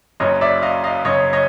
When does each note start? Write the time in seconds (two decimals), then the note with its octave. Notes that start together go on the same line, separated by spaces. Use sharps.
0.20 F#1 F#2 C#3 C#5 D#5
0.41 D5 E5
0.62 D#5 F5
0.84 D#5 F5
1.05 F#1 F#2 C#3 C#5 D#5
1.33 C#5 D#5